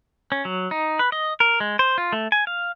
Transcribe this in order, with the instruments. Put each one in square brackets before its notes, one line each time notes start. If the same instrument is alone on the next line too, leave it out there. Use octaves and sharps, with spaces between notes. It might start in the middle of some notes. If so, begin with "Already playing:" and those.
[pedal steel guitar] C#4
F#3
D#4
B4
D#5
A#4
G#3
C5
F4
A3
G#5
F5